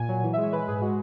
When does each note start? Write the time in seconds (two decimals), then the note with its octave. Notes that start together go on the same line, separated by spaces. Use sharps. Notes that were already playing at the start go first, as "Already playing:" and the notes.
Already playing: A#2 G#5
0.09 F#3
0.23 E3
0.33 G#3 E5
0.43 C#5
0.52 G#3 B4
0.68 G#2 G#4
0.81 G#3 F#4